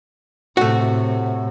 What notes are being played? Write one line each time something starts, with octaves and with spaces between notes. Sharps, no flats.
A2 C3 A3 F#4